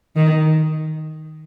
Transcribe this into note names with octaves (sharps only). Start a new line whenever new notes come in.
D#3